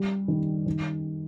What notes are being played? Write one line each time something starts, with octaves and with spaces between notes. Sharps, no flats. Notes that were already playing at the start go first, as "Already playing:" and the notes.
Already playing: G3
D#3
D#3